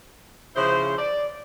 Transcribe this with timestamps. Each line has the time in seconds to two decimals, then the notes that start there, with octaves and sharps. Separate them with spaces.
0.56 C#3 F3 E4 C5
0.98 D5